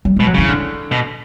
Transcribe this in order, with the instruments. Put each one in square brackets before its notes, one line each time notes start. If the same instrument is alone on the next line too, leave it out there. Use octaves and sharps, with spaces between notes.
[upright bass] F#3
[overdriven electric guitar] B2 [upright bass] G#3
[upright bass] F#3
[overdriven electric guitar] C#3 [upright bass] E3
[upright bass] D3
[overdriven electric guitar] B2